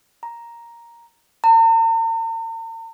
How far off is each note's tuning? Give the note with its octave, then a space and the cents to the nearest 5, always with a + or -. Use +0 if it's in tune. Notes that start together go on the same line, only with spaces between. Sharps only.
A#5 +5
A#5 -45